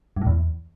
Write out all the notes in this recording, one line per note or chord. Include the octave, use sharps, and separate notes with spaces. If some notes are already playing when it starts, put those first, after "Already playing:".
G2
A2
E2